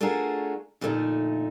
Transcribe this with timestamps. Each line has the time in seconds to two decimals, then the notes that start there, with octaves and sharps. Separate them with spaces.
0.01 A3 D4 F4 F#4 G#4 A#4
0.81 F2 A#2 D3 A3 C#4 D#4